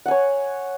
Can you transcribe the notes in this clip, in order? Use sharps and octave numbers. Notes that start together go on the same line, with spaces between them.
C#5 F#5 G#5